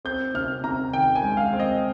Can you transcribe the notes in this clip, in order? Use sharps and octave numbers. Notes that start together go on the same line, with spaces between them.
C4 G6
C3 F6
C3 A#5
D#3 G5
G#5
G#3
F5
C4
D#5